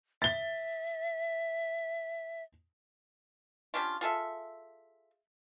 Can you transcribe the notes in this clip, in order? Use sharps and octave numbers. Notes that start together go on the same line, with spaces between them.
E5 A6 G7
G3 C#4 D4 F4
F4 G#4 A4 E5